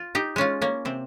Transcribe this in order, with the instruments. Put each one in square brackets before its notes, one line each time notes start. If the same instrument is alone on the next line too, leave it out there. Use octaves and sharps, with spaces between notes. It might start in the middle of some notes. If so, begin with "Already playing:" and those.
Already playing: [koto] F4
D#4 G4
G#3 C#4 F4
A#3 C#4
C3 C4